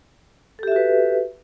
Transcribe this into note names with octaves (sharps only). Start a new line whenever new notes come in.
F#4 G4 A4 B4 E5